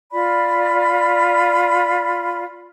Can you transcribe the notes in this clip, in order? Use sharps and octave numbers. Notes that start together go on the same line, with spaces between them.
F4 D5 B5